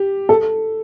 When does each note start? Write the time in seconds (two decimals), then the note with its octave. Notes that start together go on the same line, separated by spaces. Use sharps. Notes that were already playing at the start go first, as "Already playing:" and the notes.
Already playing: G4
0.29 A4